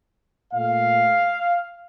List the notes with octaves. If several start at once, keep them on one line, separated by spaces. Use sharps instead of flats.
A#2 A3 F5